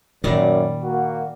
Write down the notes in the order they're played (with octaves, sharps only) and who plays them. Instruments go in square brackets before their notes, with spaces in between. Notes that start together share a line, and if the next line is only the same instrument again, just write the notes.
[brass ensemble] F#2 [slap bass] A#2 D#3 [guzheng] G3 D5
[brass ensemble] A#3 F#4